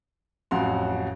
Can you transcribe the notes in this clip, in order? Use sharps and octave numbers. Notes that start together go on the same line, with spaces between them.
A1 F2 F#3 F#4 F5 C6